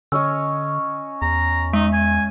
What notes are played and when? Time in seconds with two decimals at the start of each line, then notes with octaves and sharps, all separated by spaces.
0.12 D3 C#4 C#5 D#5 E6
1.22 E2 A#5
1.73 G#3 D#4
1.93 G#5